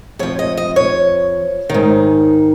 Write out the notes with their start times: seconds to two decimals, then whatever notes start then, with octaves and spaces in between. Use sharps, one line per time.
0.19 F2 F3 C#5
0.39 D#5
0.57 D#5
0.76 C#5
1.69 G#2 D#3